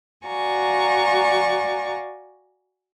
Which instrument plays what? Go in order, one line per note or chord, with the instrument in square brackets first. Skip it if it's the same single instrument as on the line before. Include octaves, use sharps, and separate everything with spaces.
[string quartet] F#4 D5 F5 G#5 A#5 C#6